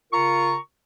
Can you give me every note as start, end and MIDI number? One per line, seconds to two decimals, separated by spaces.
0.12 0.55 49
0.12 0.55 65
0.12 0.55 70
0.12 0.55 82
0.12 0.55 85